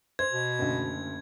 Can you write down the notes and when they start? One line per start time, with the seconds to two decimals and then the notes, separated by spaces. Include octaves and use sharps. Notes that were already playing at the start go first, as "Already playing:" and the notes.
0.19 C5 G#6
0.33 B2
0.59 F#1 D2